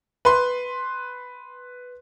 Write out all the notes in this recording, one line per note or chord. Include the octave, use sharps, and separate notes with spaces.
B4 C6